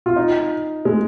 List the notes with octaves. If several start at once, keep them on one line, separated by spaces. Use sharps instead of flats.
F4
D#4
G#3